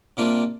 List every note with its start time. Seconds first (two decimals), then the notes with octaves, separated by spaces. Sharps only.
0.17 C3 G3 A#3 D4 F4